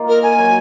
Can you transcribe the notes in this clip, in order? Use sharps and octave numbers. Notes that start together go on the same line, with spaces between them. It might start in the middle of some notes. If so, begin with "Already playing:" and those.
Already playing: A#3 D#4 F4
A#4
G#5
F#3